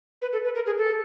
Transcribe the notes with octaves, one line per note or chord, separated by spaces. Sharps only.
B4
A4
B4
A#4
G#4
A4